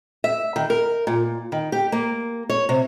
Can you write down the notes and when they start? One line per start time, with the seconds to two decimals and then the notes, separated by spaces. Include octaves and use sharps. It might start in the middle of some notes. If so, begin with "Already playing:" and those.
0.24 E5
0.56 D#3
0.70 A#4
1.07 A#2
1.52 D#3
1.72 G4
1.92 A#3
2.50 C#5
2.69 C3